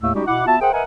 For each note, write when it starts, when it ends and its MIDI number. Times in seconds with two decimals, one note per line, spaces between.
0.02 0.12 39
0.02 0.12 45
0.02 0.12 57
0.02 0.12 88
0.14 0.22 55
0.14 0.22 56
0.14 0.22 61
0.14 0.22 63
0.14 0.22 66
0.14 0.22 67
0.27 0.46 47
0.27 0.46 64
0.27 0.46 78
0.27 0.46 86
0.47 0.56 59
0.47 0.56 65
0.47 0.56 66
0.47 0.56 76
0.47 0.56 81
0.61 0.72 68
0.61 0.72 70
0.61 0.72 72
0.61 0.72 76
0.61 0.72 78
0.61 0.72 79
0.73 0.83 70
0.73 0.83 71
0.73 0.83 75
0.73 0.83 76
0.73 0.83 78
0.73 0.83 80